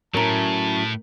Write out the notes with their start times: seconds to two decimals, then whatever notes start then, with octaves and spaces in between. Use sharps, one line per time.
0.14 A2 F#3 C#4 E4 A#4 A5 A#5